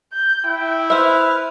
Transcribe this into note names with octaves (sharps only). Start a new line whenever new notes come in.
G6
E4 G5
B4 C5 E5 F6